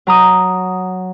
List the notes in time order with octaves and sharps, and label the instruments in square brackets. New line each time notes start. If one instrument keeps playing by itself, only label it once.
[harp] F#3 A#5 D#6